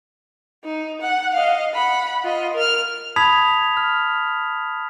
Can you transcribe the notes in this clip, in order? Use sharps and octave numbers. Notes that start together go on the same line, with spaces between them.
D#4
F#5
D#5 F5
F#5 B5
F4 D#5
A#4 F6
A5 B5 D#6 G#6 B6 F7
F6